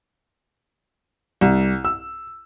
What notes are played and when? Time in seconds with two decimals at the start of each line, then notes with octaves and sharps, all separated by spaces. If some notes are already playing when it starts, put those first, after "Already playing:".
1.41 C2
1.85 E6